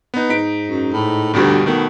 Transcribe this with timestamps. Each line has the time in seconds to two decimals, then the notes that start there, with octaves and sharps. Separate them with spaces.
0.14 B3 D#4
0.30 G#2 D#4 B6 D7
0.68 F#2
0.92 A2
1.33 D2 G2 B2 G3
1.66 B2 D#3 A3 B3